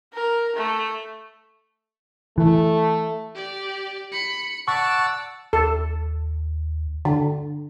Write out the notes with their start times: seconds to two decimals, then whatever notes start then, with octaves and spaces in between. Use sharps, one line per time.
0.13 A#4
0.56 A3
2.38 E3 A3
3.35 G4 D5
4.12 B5 C#7
4.68 D5 F#5 A5 C#6 E6
5.53 D#2 A4
7.05 D3